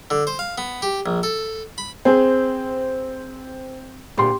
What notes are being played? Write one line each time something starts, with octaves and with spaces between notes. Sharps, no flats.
D3
C5
F5
B3
G4
A#1
A4
B5
C4 G#4 C5
D2 A#2 G4 C6